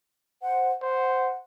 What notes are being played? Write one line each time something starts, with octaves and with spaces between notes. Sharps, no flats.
C5 F#5
C5 F#5